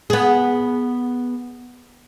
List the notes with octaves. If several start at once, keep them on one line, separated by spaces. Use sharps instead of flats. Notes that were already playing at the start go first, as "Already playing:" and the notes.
B3 G#4